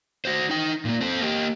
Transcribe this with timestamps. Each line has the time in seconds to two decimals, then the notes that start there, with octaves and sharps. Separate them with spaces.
0.25 F#4 C5
0.50 D#4 G5
0.85 A#2 A#3
1.01 C4 A4
1.21 A#3 G4